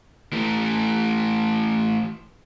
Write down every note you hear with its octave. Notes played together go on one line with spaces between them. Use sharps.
E3 A3